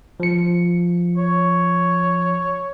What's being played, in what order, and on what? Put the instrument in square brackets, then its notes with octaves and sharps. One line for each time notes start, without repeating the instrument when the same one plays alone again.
[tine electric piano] F3 C#7
[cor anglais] C#5